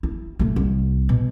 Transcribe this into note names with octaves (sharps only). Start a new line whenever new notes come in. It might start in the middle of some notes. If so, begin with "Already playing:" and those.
E4
C3 A3
C2
B2